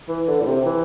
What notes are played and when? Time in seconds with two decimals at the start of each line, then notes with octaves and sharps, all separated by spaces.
0.08 E3
0.28 D3
0.42 A2
0.46 C3
0.66 E3